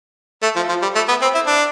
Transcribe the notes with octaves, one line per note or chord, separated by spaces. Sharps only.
A3
F3
F3
G3
A3
B3
C4
E4
D4